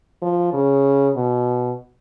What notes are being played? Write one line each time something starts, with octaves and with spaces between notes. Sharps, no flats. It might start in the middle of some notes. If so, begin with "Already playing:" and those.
F3
C#3
B2